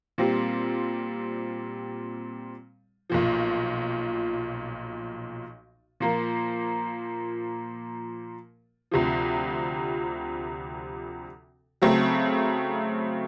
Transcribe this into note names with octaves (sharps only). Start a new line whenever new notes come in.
A#2 G3 C4
B1 A#2 F3
A#2 F3 A#3
D2 C3 F3
C#3 F#3 A3 C4